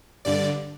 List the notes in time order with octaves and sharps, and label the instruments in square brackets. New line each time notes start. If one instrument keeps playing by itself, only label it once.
[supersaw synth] G2 D3 D5